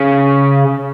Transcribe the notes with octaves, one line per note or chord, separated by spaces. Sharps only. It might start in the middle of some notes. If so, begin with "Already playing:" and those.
Already playing: C#3